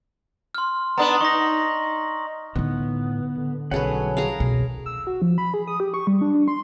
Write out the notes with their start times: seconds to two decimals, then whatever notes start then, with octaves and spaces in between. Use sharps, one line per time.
0.55 C6 F6
0.98 B3 D4 B4 A#5 D#6 F#7
1.21 D#4 C#6 A#6
2.56 A2 D3 B3 D#4
3.37 D3
3.71 B1 F#3 G3 C#4 G#4 A4 B4 F#5
4.17 G#4 A#4 F5
4.40 C2 F2 B2
4.86 E6
5.07 F#4
5.22 F3
5.38 B5
5.54 G#4
5.67 D#6
5.80 G4
5.94 C#6
6.07 G3
6.21 D4
6.34 D4
6.48 C6